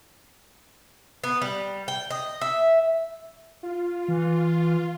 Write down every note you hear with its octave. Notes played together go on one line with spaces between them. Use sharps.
B3
G3
G5
D#5
E5
F4
E3